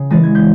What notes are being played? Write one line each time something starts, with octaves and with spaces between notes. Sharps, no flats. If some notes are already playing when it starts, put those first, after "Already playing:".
Already playing: C#3
E3 G#3 A6
G#6
G6